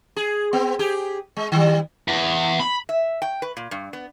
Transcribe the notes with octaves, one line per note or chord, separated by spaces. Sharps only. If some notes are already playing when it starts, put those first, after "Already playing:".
G#4
B3 C4
G4 G#4
G#3
D#3 G3
E2
B5
E5
G5
B4
A#2
G2
B3